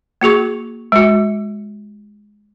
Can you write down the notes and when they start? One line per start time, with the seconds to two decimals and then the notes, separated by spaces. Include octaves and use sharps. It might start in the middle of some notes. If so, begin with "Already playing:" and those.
0.21 A#3 F#4 G#4 C#6
0.92 G#3 F#4